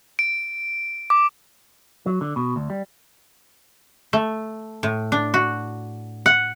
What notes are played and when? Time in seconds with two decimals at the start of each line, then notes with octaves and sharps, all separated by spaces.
0.19 D7
1.10 D6
2.06 F#3
2.21 D3
2.36 B2
2.56 D2
2.70 G3
4.13 A3
4.83 A2
5.12 D4
5.34 F#4
6.26 F#5